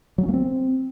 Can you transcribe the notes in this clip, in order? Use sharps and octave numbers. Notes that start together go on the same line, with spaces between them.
F#3
C#4
A#3
C4